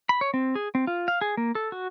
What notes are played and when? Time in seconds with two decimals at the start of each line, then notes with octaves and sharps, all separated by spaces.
0.09 B5
0.21 C#5
0.34 C4
0.55 G#4
0.75 C4
0.87 F4
1.08 F5
1.21 G#4
1.37 A#3
1.55 A4
1.72 F#4